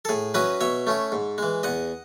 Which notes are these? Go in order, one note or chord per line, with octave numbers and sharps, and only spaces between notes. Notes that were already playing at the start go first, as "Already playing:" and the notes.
A4
A2 G#4
F#3 C#4 E4 B4 D#5
B2 C#5 E5
A3 C#4 E4
G#2
E3 G#3
E2 D#5 F#5